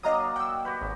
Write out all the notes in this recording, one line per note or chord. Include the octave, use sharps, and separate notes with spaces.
F#3 A#3 D4 D#5 A#5 D#6
D5 D#5 F#5 G5 E6
F#4 G4 B4
G#1